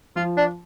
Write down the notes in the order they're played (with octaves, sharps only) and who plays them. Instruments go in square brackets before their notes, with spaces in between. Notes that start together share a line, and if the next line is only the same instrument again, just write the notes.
[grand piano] F3 [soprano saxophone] F4
[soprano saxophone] D4